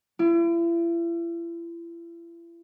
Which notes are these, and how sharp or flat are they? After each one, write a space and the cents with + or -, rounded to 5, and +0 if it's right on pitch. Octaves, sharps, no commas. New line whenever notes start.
E4 +40